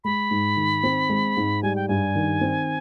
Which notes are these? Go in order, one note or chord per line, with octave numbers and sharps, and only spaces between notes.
G#3 B5
G#2
D#3
C4
G#3
G#2
G3 G#5
G5
G2 G#5
D#3
C4